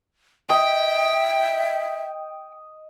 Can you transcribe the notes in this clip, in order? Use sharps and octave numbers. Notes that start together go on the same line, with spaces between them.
D#5 E5 G5